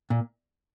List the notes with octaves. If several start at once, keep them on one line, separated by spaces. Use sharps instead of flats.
A#2